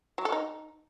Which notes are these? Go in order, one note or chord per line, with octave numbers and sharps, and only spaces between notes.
F#3
A4
D#4